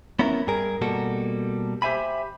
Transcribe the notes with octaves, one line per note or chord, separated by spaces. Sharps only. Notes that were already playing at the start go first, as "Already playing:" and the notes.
B3 C#4 E4 A#4
G2 G#4 A#4
B2 G3 A#3 F#4 A4
G4 C5 E5 G#5 B5